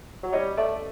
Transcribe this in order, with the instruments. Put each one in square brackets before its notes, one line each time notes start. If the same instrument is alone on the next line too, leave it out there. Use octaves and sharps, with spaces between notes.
[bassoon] F#3
[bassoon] G3 [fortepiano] C#5 D#5
[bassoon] A3 [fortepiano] D5 E5